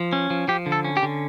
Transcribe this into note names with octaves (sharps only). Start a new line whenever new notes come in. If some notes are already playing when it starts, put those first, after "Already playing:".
Already playing: F3
C#4
F3
F3 G4
D3
A4
C#4
G4
D3